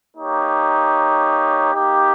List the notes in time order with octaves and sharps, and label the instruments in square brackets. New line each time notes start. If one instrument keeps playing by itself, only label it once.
[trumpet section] A#3 D#4 G4 C#5
A#3 D#4 G4